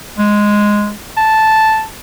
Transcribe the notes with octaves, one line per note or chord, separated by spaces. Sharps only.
G#3
A5